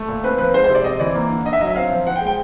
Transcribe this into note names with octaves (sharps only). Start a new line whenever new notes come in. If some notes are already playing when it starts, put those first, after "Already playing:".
Already playing: A3
A#2
C4 B4
F3 B4
G#3 C5
C5
C3
D5
C4 D#5
E3 D5
A#3
D3
D3 D#5
E5
F#3 D#5
E5
C4 F5
F3
F3 F#5
G5
G#3
G5